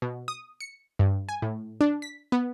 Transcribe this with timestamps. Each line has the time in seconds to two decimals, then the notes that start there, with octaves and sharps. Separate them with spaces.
0.02 B2
0.28 D#6
0.60 C#7
0.99 G2
1.29 G#5
1.42 A2
1.81 D4
2.02 B6
2.32 B3